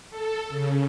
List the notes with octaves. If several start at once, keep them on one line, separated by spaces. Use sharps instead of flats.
A4
C#3